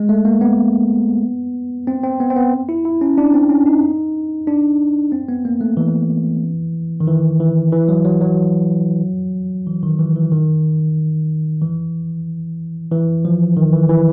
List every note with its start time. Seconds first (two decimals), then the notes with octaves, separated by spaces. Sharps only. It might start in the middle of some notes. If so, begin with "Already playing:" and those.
Already playing: G#3
0.09 A3
0.25 A#3
0.41 B3
1.87 C4
2.03 C4
2.20 B3
2.30 C4
2.36 B3
2.69 E4
2.85 E4
3.01 C#4
3.18 D4
3.34 C4
3.50 C#4
3.66 D#4
4.47 D4
5.12 C4
5.29 B3
5.45 A#3
5.61 A3
5.77 E3
7.00 D#3
7.07 E3
7.40 E3
7.72 E3
7.89 F#3
8.05 F#3
8.21 F#3
9.67 E3
9.83 D#3
9.99 E3
10.16 E3
10.32 D#3
11.62 E3
12.92 E3
13.25 F3
13.57 D#3
13.73 E3
13.89 E3